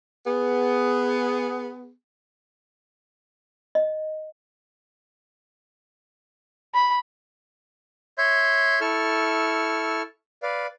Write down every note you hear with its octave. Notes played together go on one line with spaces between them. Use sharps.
B3 G#4
D#5
B5
C#5 E5 C6 G6
E4 A4 C#6 E6 F6
B4 D5 F5